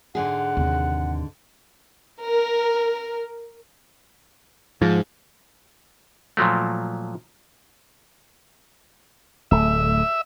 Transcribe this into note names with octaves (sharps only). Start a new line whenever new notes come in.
G#2 D3 G#4 F#5
D#2 C3
A#4
G#2 F3
A#2 F3 F#3 A3
D1 A3 E5